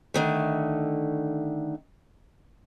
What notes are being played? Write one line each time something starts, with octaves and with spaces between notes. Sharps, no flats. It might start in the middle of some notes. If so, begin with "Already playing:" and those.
D3 D#3 A3